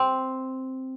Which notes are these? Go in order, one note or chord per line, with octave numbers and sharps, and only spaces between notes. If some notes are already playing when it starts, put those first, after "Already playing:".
Already playing: C4